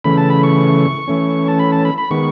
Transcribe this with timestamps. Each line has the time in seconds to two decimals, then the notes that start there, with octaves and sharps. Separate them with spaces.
0.04 C#3 E3 A3 B5
0.17 A5
0.30 B5
0.43 C#6
1.08 E3 A3 C#4
1.48 A5
1.59 B5
1.72 A5
1.85 B5
1.98 B5
2.11 D#3 G#3 B3 C#6